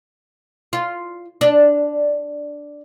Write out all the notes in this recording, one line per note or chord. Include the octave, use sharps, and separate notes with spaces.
F4
D4